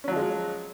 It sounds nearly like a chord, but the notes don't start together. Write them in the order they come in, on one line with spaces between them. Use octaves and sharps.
C#4 F#3 F3 G#3